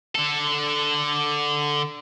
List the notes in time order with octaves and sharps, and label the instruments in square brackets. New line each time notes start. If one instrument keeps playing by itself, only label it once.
[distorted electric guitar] D3 A4